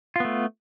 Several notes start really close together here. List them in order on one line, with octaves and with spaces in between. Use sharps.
F4 B3 A3